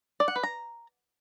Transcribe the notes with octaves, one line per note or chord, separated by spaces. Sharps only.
D5
F#5
B4
A#5